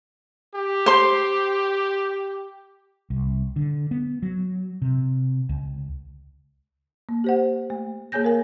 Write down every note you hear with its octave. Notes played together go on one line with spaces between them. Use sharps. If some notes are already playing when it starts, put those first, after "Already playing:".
G4
C5 C6
C2
D3
B3
F#3
C3
C#2
A#3
G4 C5 F#5
A3
A#3 G#4 C#5 G#5 G6 A#6
A#4 F5 G#5